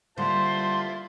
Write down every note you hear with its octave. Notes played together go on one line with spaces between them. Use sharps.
D3 G3 A#3 E4 F4 C5 A5 C6